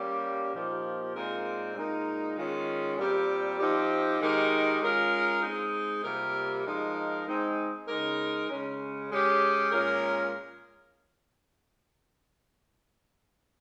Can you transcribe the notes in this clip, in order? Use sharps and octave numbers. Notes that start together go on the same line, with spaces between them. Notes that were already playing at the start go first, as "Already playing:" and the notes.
Already playing: G3 A#3 C#4 G4
A#2 F3 A#3 D#4 G4
A#2 G#3 C4 D#4 A#4
A#2 G#3 D#4 A#4
D#3 G#3 C#4 F4
A#2 G3 C4 G4 A#4
F3 C4 D#4 G4
D#3 G#3 D#4 G4 A#4
G#3 C#4 F4 A#4
G#3 C4 D#4
C3 G3 A#3 F4 A#4
F3 G#3 D#4 A#4
G#3 C4 D#4 G#4
C#3 G#3 D#4 A#4
C#3 G#3 C#4
G#3 C#4 G4
A#2 G#3 C#4 F4 A#4